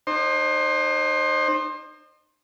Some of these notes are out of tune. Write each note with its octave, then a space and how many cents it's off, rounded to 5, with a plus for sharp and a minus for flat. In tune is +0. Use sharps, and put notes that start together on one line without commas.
D#4 -40 C5 +20